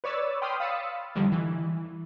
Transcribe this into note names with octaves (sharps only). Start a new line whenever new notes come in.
B4 C#5 D5 E6 A6
G5 B5 C6 D6 D#6 F6
F5 B5 D#6 E6 A6 C#7
F2 D3 D#3 G3
E3